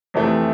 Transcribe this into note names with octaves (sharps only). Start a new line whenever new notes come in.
F2 C3 E3 A3 C4